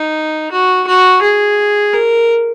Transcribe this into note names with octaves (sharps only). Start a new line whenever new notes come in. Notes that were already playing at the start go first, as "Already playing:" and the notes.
Already playing: D#4
F#4
F#4
G#4
A#4